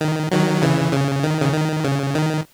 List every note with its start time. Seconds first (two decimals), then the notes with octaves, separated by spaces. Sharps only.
0.01 D#3
0.31 D#3 F#3
0.62 C#3 E3
0.93 C#3
1.23 D#3
1.41 C#3
1.54 D#3
1.84 C#3
2.15 D#3